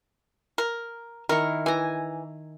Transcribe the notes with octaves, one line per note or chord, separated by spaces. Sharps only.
A#4
D#3 E4 A#4 C#6
E3 G#5 A#5